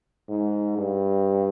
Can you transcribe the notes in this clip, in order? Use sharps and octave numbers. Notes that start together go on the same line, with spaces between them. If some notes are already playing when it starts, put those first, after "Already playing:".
G#2
G2